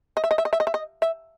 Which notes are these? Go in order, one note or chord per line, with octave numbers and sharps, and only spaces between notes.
D#5
E5
D#5
E5
D#5
E5
D#5
E5
D#5
E5